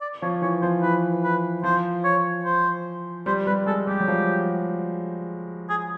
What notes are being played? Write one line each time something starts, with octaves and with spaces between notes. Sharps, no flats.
D5
F3 C#5
E3 C#5
F3 C5
E3 B4
B4
F3 C5
C#5
C5
G3 C5
G3 B4
G#3 A4
G3 G4
F#3
F3
G#4